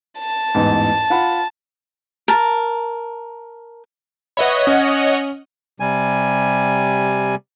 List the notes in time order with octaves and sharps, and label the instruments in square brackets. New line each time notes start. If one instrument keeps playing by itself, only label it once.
[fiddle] A5
[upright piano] A1 E2 G#2
F4 F#5 B5
[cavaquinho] A#4 A5
[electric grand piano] B4 E5 B5 [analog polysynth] C#5 D#5 F#5
[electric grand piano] C#4
[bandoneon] C3 G3 G#5